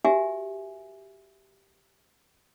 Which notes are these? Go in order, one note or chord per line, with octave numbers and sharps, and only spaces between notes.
F#4 G4 A#4 E5 G#5